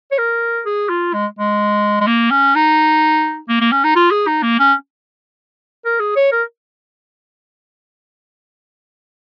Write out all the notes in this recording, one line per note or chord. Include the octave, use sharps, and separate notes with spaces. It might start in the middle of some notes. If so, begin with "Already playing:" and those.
C#5
A#4
G#4
F4
G#3
G#3
G#3
A#3
C#4
D#4
A#3
A#3
C#4
D#4
F4
G#4
D#4
A#3
C#4
A#4
G#4
C#5
A#4